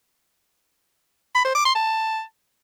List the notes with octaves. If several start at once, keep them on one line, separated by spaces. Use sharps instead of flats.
B5
C5
D6
C6
A5